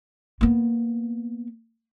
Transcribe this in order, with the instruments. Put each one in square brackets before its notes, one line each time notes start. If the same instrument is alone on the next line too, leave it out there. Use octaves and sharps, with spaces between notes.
[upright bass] A#3 B3